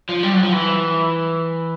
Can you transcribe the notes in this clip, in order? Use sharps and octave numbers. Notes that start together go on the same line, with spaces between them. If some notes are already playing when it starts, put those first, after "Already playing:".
F3
G3
F#3
F3
E3